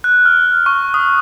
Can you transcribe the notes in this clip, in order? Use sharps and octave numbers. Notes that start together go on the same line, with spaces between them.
F#6
F6
C#6
D#6